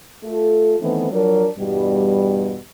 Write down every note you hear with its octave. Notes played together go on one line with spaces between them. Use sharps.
A3 F4 A4
D#3 E3 A3 B3 C4
F3 F#3 D4 A#4
E2 G2 B2 G3